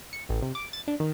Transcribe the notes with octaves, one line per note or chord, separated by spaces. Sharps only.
C#7
A1
C3
D6
A6
D4
D#3